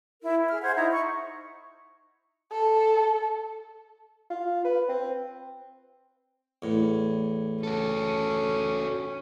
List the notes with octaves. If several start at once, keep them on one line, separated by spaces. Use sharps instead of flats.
E4 A#4
E5
G#4 F6
C5 F#5 G#6
D#4 E4 A#5
C#6
A4
F4
B4
C4
E2 A2
C#4 F#4 A4